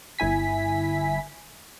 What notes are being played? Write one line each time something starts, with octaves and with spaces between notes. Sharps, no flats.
G1 E4 G#5 B6